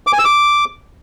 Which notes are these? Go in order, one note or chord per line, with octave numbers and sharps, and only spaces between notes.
D6
G#5
E6
D6